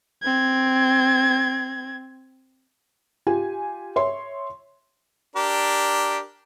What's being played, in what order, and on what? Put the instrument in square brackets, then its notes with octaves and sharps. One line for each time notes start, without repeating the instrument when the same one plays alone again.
[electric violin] C4 G#6
[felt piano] F4 G4 G#5
C#5 E5 C6
[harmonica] D4 G4 A#4